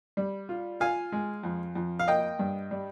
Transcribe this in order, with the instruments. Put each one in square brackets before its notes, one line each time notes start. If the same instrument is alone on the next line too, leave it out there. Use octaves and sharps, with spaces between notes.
[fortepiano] G3
F4
F4 F5 G#5
G#3
F2
F2
F5
A#3 D#5 G5
G2
G3